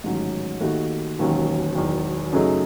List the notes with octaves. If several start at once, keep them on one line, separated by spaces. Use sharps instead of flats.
A1 G#2 D#3 F#3 C#4
D#2 D#3 A3 D#4 F#4
E1 D#2 D#3 F#3 C#4
E1 E2 D#3 F#3
F#2 C#3 F#3 A3 D#4